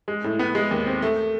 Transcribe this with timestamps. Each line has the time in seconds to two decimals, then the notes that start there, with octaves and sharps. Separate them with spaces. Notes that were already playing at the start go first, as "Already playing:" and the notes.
0.08 G#3
0.24 A2
0.39 B3
0.55 G#3
0.71 D#2
0.86 C4
1.02 A3